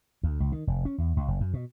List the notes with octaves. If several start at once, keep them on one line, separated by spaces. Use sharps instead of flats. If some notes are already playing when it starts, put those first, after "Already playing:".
D2
C#2
D#3
F1
C#4
E2
C#2
F#1
F#2
B2